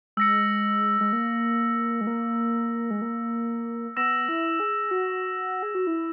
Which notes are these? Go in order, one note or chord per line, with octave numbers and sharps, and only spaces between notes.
G#3 E6 A#6 C#7
G#3
A#3
G#3
A#3
G#3
A#3
B3 E6 A#6 E7
E4
G#4
F#4
G#4
F#4
E4